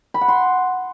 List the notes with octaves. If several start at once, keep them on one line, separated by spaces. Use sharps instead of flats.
B5
F#5
C6